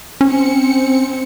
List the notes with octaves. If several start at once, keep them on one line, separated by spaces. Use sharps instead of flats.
C4 C#4 C#7